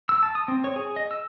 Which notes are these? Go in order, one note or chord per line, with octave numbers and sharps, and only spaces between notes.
E6
A5
D#6
C4
C#5
G#4
D#5
E6